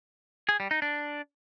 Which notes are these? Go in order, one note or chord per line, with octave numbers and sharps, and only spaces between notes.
G#4
G3
D#4
D4